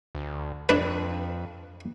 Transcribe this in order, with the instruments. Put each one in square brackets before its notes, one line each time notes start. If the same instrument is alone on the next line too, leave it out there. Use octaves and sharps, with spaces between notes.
[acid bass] D2
[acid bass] F2 [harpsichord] D4 B4